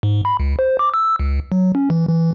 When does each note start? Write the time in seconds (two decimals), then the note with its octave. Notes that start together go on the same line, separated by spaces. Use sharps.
0.03 G#2
0.25 B5
0.40 C#2
0.59 C5
0.79 D6
0.94 E6
1.19 C#2
1.52 F#3
1.75 C#4
1.90 E3
2.08 E3